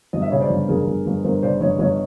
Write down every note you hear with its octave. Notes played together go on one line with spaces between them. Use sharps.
G1 D#5
E5
C#3 C#5 D#5
C5 D5
G1
G1 G#4 A#4
G1
G1
G1 A#4 C5
C#3 C5 D5
G1 C#5 D#5
G1 C#5 D#5